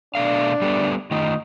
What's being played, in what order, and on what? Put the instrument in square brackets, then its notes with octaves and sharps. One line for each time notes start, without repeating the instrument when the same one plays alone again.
[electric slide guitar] B2 A3 F5 [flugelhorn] D4
[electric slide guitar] G3 A3 B3
[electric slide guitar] D#3 A3 F4 [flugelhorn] D#4